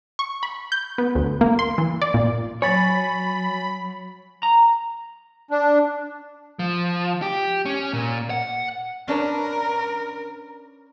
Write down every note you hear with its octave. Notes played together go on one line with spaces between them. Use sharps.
C#6
B5
G6
B3
D2
A#3
C6
E3
D5
A#2
F#3 C#5 G#5 B5 A6
A#5
D4
F3
G4
C#4
A#2
F#5
C#4 D4 A#4 B4